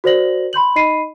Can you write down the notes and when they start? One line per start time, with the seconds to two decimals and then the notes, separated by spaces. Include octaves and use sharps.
0.04 F#4 A#4 C5 D5 A#6 F#7
0.53 B5 C6 G6 F#7
0.76 D#4 D#5 B5 C7 D#7